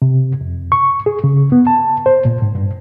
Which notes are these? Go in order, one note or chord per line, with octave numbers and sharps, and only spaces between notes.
C3
F2
C#6
G#4
C#3
B3
A5
C5
A#2
G#2
G2